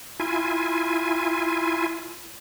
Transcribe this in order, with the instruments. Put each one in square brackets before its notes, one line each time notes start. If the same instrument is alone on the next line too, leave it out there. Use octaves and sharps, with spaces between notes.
[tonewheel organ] E4 F4 G#5